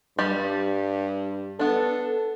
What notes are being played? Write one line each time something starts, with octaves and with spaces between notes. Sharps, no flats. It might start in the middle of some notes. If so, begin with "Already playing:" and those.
G2 G3 G4 D5
B3 D4 A4